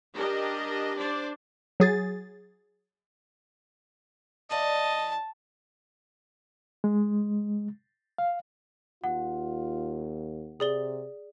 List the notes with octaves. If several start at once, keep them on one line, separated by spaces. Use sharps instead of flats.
D4 G4 A#4 D#5
D4 C5 D5
F#3 G#4 A6
E3 D5 D#5 F5 A5
G#3
F5
D#2 F4 F#5
C3 G#4 D5 G7